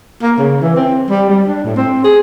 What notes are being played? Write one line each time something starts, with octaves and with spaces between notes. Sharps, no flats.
A#3
C#3
E3
C4
G3
G3
D4
A2
C4
G#4